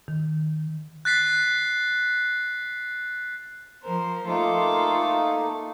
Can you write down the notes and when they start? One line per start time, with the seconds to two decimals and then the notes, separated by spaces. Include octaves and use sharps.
0.08 D#3
1.05 F#6 A6 B6 C7
3.83 F3 A#4 C5
4.28 A3 A#3 D#4 F4 A4 D6